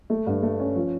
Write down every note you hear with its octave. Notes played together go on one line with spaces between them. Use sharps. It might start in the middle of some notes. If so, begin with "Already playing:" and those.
A3
G2
A3
C#4
F3